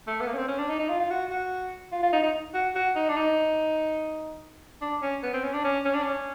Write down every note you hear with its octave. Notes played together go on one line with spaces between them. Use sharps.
A3
B3
A#3
C#4
C4
C#4
D4
D#4
D#4
F4
F4
F#4
F#4
F4
F4
D#4
D#4
F#4
F#4
D#4
D4
D#4
D4
C#4
B3
C4
C#4
D4
C#4
C#4
D4
C#4